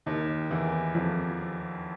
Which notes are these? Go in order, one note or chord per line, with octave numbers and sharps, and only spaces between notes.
D#2 D#3
E2 E3
F2 F3